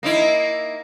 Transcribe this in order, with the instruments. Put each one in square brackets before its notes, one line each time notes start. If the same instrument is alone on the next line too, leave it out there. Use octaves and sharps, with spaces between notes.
[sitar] A#3 D#4 E4